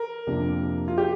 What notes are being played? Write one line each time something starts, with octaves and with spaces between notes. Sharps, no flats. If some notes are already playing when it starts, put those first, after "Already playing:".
Already playing: A#4
F2 C3 A#3 D4
F4
G4